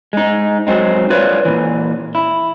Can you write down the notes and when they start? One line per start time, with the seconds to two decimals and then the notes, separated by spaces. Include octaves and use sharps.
0.13 G#3 D#4
0.67 F#3 G#3 C4 D#4
1.10 F4 B4 C#5 D5
1.45 A#2 E3
2.15 E4